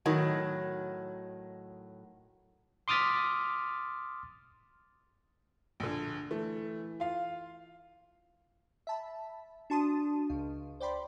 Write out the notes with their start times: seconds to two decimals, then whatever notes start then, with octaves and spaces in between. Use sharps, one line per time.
0.06 A2 D#3 F#3
2.88 C6 D6 D#6 F6 A6 B6
5.80 A#1 D3
6.31 E3 A3
7.00 F4 F5
8.87 E5 A5 B5
9.70 D4 F#4 A5 C6 D#6 D#7
10.30 C#2 F5
10.80 C5 D5 G5 B5 C6